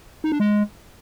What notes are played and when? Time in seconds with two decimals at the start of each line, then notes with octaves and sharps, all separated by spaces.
0.24 D#4
0.32 D4
0.40 G#3